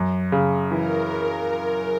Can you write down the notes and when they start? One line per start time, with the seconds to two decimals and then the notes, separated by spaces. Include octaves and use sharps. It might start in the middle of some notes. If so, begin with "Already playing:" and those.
Already playing: F#2
0.32 C#3
0.71 E3 A#4